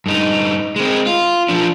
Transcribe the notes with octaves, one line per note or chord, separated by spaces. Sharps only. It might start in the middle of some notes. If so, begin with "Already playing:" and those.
G2 D#4
G#3 C4
F4
F3 D4